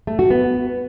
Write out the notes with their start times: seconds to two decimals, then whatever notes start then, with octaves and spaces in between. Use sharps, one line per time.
0.07 A3
0.19 F#4
0.30 B3